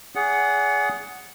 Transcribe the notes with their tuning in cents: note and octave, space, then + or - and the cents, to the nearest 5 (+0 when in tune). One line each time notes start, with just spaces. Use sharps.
G#4 +0 D5 -40 F#5 +0